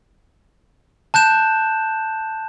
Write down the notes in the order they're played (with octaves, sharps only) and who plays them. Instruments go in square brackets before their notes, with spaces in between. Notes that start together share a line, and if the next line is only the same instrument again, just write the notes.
[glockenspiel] A5 F#6 G6 E7